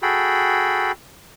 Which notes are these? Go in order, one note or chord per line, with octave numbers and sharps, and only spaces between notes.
F#4 G#4 A4 G5 B5